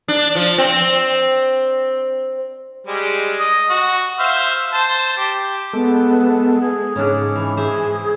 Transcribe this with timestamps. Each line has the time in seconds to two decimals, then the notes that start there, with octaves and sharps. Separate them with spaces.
0.08 D4
0.35 F3
0.58 C4
2.87 G3 G#3
3.39 D#5
3.70 F#4
4.19 C5 E5 F5
4.73 C5 A5
5.17 G4
5.73 G#3 B3 A4
6.60 G#4
6.95 G#2 C#3 C#4 D4
7.36 E3
7.57 G#4 C5 E5